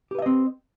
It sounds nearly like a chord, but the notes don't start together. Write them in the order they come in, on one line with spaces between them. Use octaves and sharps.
G4 B4 E5 D#5 C4